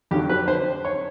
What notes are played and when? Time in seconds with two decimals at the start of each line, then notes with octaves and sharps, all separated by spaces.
0.11 F2 D3 F#3 G4
0.29 B4
0.48 C5
0.85 C#5